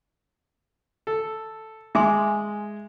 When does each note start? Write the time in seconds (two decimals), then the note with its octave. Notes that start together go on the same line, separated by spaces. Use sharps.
1.07 A4
1.95 G#3 E5 G#5 C6 D6